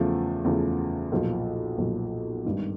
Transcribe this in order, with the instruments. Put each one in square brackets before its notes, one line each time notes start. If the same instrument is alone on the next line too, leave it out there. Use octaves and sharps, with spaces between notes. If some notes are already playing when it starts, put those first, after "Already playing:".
Already playing: [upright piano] E2 C#3 F3 A3
E2 C#3 F3 A3
B1 A#2 F3
B1 A#2 F3
G#1 G2 D#3